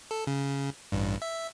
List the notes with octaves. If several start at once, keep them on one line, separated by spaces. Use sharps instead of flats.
A4
C#3
A1 G2
E5